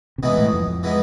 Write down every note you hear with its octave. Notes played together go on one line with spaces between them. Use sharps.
C3
B2 E3 G#3 B3 D#4
A#2
A2
F2
F2
E3 G#3 B3 D#4